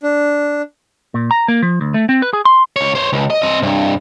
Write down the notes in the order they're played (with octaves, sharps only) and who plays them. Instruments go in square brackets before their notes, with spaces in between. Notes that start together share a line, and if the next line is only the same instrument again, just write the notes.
[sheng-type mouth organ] D4
[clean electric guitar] A#2
A#5
A#3
F3
D2
A3
C4
B4
G#4
C6
[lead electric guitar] C#2 C#5
C5 C#5
C#2
D#5
C4 D#5
C2 G2